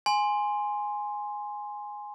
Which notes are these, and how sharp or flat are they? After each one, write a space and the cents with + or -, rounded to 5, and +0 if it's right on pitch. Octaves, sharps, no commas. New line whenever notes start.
G#5 +0 C6 +0